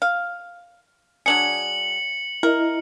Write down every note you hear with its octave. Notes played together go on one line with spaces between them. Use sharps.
F5
F#3 D4 G#4 C#7 F#7
E4 A#4 D#5